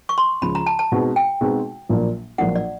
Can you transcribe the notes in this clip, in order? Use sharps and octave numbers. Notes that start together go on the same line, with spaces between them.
C#6
C6
C#2 C#3 F3 B5
A#5
A5
A5
B2 G#3 C4 D#4 F#4
G5
B2 G#3 C4 D#4 F#4
A#1 A#2 F#3 A#3 D4
A#1 A#2 F#3 A#3 D4 F#5
D5